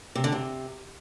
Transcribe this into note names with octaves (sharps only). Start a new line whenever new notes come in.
C3
D3
C3